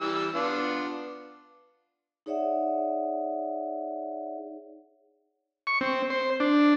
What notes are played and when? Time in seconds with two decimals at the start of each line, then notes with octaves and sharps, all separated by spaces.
0.01 E3 G3 E6
0.35 B3 D4 F4
2.26 D#4 G#4 C#5 D5 E5 F#5
5.67 C#6
5.81 C4
6.10 C5
6.40 D4